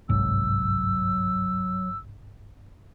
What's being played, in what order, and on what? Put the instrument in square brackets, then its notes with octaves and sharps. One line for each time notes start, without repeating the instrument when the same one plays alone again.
[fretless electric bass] G1 C2 G#2 [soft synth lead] F#3 [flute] E6